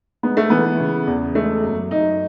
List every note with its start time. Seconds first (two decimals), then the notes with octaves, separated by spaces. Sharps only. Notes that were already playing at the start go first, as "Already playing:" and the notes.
0.23 G#3 B3
0.37 A3
0.50 E3 B3
0.80 C#3
1.07 E2
1.35 G#3 A3
1.63 F#2
1.91 F#2 D#4